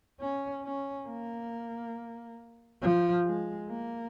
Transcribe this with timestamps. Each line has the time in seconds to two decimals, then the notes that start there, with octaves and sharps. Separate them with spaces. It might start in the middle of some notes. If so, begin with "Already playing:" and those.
0.20 C#4
0.64 C#4
1.08 A#3
2.82 F3
3.26 G#3
3.69 A#3